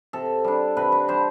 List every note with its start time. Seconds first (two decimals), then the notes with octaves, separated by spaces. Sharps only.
0.13 C3 A4
0.44 G3 D4
0.77 C3 B4
0.92 B4
1.08 G3 D4 C5